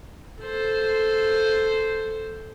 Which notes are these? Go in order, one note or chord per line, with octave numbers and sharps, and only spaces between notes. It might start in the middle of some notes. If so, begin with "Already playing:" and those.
A4 C5